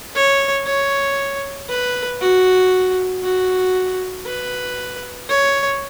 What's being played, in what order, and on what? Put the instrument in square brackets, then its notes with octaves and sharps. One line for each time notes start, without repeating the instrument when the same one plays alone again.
[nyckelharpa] C#5
C#5
B4
F#4
F#4
B4
C#5